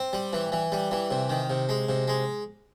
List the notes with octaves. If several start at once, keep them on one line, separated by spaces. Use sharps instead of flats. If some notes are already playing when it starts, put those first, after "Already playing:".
Already playing: C4
G3
E3
E3
G3
E3
C3
D#3
C3
G#3
C3
G#3